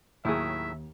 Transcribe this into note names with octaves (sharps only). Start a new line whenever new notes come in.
D#2 A2 D#3 F#3 E4 G#4 E5